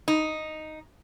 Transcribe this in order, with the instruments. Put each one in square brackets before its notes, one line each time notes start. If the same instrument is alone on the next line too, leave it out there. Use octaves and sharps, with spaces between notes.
[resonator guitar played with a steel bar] D#4